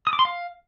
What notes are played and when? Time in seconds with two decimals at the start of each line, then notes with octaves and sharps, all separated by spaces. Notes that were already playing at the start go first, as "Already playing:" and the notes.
0.07 D#6
0.13 D6
0.19 C6
0.25 F5